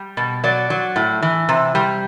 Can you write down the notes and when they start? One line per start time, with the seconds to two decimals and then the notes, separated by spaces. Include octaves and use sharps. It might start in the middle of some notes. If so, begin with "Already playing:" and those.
Already playing: G3
0.17 B2
0.44 F#3 D5
0.70 F#3
0.96 A2
1.22 E3
1.49 C3
1.75 G3